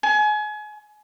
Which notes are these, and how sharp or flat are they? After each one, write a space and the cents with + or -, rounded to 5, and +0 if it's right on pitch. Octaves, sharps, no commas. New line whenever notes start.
G#5 +30